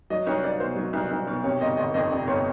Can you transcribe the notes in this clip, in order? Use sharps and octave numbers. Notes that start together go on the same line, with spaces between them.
F#3 D#5
C2 C#5
C2 D5
B2 C5
F#3
C2
C2
B2
C3 C#5
G1 D#5
G1 D#5
F2 D#5
C3 D5
G1 C#5